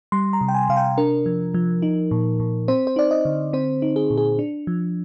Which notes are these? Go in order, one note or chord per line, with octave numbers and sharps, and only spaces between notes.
G3 C6
A#5
C3
G5
G#5
C3 F5
G5
D4 A#4
F3
F3
D#4
A#2
A#2
C4 C5
C5
D#4 D5
D#5
D3
C4 C5
D#4
G#4
A#2
G#4
D4
F3